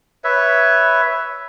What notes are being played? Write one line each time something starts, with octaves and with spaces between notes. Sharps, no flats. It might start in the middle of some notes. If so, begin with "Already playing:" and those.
B4 C#5 E5